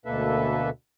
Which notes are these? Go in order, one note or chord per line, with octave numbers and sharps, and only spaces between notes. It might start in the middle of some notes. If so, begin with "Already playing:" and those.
D2 B2 A#3 A4 B4 E5